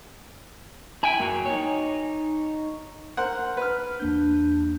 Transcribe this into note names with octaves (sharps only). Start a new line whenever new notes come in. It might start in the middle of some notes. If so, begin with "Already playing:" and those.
E4 G5 G#5
F#2 F#3 A#3
D#4 C#5
A#4 C5 F#5
B4 F6
E2 A#3 D4 G6